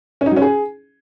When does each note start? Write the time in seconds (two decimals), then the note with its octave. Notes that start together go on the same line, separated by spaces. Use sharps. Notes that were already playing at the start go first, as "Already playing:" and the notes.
0.21 C#4
0.26 D#4
0.31 F#3
0.36 C#4
0.42 G#4